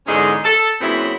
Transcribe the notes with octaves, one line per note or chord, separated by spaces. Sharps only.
E2 G#2 D3 G#3 C#4 D#5
A4
A#2 C#3 F#3 B3 C4 E4